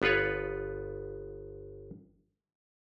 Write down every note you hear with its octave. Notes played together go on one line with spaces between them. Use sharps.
G1 B3 F4 B4 C#5